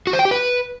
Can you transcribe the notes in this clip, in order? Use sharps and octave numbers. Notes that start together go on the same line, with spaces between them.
F#4
C5
G5
G4
B4